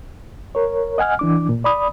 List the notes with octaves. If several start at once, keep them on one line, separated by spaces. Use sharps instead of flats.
A#4 C#5
D#5 F#5 G#5 F6
E3 D4 D6
A#2
D5 B5 D#6